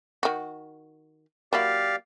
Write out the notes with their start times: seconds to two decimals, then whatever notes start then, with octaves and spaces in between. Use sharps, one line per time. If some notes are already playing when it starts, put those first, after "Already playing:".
0.23 D#3 F#4
1.53 F#3 A#3 E4 G4 D5 F5